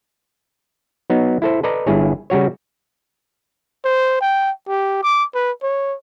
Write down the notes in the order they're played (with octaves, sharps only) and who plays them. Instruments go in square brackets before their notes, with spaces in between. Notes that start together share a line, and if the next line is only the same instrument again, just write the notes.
[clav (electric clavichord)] F#3 B3 D#4
E4 A4 C5
A4 B4 D5 D#5 A#5
G1 G2 E4 G#4 C#5
C#3 G3 F#4 C#5
[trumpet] C5
G5
G4
D6
B4
C#5